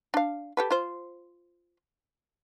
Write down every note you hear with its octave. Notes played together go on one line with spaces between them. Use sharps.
D4 F5
G4 A4 B4
F4 C5